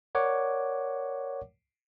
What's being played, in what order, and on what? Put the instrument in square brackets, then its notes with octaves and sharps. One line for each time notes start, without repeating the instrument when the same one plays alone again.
[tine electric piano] A#4 C#5 D5 F#5 D6